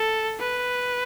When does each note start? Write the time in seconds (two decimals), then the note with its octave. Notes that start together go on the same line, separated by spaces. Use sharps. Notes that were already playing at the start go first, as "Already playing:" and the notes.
Already playing: A4
0.40 B4